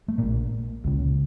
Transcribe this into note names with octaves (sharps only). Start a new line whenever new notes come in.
A3
A#1 A#2 A#3
C#2 C#3